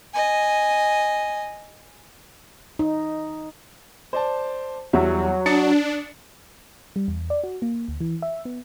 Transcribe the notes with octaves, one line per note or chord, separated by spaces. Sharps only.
D#5 G#5
D#4
C5 D5 A5
E2 F#3 G3 E5
D4 D#6 A6 C#7
G3
E2
D5
F#4
A#3
D2
E3
E5
B3